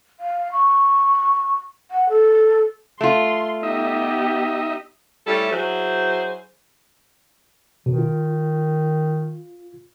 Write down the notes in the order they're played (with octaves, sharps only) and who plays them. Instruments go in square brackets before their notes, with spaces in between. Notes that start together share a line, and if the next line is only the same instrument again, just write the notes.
[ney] F5
C#6
F#5
A4
[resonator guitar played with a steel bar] A3 F4 [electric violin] C6
[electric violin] B3 G4 [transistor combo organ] D#4 D#5 E5
[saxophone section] G3 A3 C#4 E4 A4
F#3 E4 G#4 C5
[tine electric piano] B2 [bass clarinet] D#3
[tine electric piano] F4